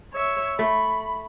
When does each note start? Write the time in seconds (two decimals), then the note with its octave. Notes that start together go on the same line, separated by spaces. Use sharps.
0.14 C#5 E5
0.59 A3 B5